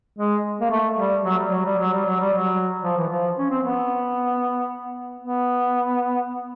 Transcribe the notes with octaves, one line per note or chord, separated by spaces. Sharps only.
G#3
A#3
A3
G3
F#3
G3
F#3
G3
F#3
G3
F#3
G3
F#3
F3
E3
F3
C#4
C4
B3
B3